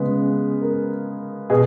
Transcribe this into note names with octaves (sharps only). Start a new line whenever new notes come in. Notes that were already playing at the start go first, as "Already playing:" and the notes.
Already playing: C#3 G#3 B3 B4
A#4
B2 G#4